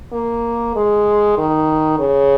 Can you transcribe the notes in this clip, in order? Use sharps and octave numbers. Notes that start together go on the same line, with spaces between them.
A#3
G#3
D#3
C#3